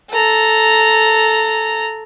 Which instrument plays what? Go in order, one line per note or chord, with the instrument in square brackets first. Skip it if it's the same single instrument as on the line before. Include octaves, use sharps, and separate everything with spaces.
[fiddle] A4 A#5